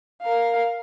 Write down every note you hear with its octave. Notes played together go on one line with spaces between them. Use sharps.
A#4 F5